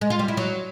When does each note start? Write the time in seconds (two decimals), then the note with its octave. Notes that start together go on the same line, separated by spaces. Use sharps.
0.01 G#3
0.10 F4
0.19 G3
0.28 E4
0.37 F#3